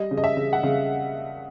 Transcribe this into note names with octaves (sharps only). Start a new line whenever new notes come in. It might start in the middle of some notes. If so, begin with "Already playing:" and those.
Already playing: G3 D#5
C#3
D#5
E5
C#3
F#5
C#3 F5